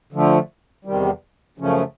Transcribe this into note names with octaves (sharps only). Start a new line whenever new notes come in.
D3 F3 A3
E2 C3 D#3 G3
F#2 C#3 F3 A3 C#4